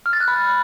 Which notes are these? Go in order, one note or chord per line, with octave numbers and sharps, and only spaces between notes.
F6
A6
F#6
B5